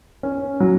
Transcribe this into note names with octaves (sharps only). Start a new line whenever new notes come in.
C#4
F#3